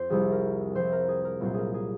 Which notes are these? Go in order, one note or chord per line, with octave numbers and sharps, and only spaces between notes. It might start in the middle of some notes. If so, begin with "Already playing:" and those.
Already playing: F2 C5
C2 C3 F3 G#4
A#4
C2 C3 F3 C5
A#4
G#4
A#4
C2 A#2 F#3 C5
G#4 A#4
G#4